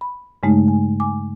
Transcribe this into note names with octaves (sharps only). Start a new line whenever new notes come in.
B5
G2 C#3 G#3 A3 D#4
G#5
G#5 D6